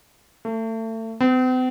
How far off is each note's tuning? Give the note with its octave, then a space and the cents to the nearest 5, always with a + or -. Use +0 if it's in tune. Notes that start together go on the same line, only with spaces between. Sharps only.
A3 +30
C4 -45